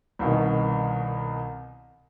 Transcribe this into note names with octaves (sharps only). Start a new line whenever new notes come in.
C2 B2 D#3